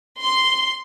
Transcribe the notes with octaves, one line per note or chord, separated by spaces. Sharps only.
C6